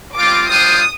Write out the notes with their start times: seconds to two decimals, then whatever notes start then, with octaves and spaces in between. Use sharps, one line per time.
0.17 G3 C4 F4 D6
0.49 G3 D4 F4 C5 G5 D#6